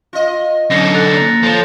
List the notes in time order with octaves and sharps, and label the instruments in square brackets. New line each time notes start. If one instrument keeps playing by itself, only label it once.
[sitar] F4 D#5
[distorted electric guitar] D3 D#4 [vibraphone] F#3 [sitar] B3 C#4 [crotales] A#6 C7 C#7
[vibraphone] A4 [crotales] F#6 A6 F7
[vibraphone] A#3
[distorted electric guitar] F3 [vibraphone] A4 C#5